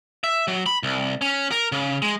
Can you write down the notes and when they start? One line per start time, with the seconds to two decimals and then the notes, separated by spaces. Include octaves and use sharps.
0.24 E5
0.48 F#3
0.66 B5
0.83 C2
1.22 C#4
1.51 A#4
1.72 C#3
2.02 G#3